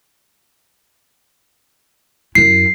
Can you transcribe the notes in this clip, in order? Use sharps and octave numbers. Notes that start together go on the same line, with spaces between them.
F#2 E4 C7